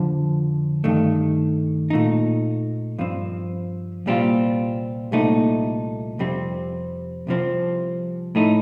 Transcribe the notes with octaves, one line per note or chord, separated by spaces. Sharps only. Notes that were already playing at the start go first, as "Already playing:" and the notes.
Already playing: F2 D3 F3
G2 D#3 A3
A#2 A3 D#4
G2 F3 C4
C2 A#2 G3 C4 F4
C2 A#2 A3 D#4
F2 C3 G3 C4
C2 C3 F3 C4
A2 A3 D#4